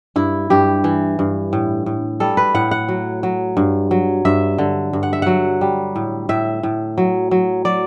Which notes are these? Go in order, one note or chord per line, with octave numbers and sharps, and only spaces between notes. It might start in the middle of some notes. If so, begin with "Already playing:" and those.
G2 E4
G2 G4
E3
G2
A2
A2
G3 A4
B4
A2 F#5
F#5
F#3
F#3
G2
F#3
G2 E5
D3
G2
F#5
E5
F#3 F#5
G3
A2
A2 E5
A2
F#3
F#3
F#3 D5